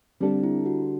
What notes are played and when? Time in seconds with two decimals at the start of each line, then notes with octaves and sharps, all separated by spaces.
0.20 D3 G3 C4 D4 A4
0.43 E4
0.66 F#4